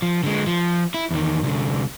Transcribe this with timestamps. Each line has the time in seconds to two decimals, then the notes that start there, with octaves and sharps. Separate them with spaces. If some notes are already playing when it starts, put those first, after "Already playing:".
0.02 F3
0.23 D3 G#3
0.47 F3
0.94 E4
1.11 E2 D#3
1.43 C2 D3